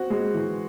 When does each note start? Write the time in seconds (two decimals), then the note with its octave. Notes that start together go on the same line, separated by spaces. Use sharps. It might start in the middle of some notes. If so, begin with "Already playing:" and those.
Already playing: C4 F#4
0.10 G#3
0.34 E3